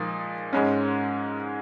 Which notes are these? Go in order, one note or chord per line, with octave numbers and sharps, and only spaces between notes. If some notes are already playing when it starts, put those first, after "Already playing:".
Already playing: A#2 F3 G#3 D#4
G#2 G#3 C#4